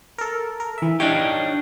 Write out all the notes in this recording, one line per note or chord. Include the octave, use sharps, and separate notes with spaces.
A4 A#4
A#4
E3 E5
D4 D#4 G4 C#5